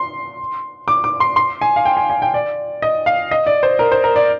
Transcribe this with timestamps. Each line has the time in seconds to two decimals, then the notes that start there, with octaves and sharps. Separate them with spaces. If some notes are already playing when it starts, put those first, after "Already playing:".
Already playing: C6
0.88 D6
1.04 D6
1.20 C6
1.36 C6
1.61 G#5
1.76 F5
1.85 G5
1.97 G#5
2.10 G#5
2.22 G5
2.34 D5
2.82 D#5
3.06 F5
3.31 D#5
3.47 D5
3.63 C5
3.79 A#4
3.92 C5
4.04 A#4
4.16 D5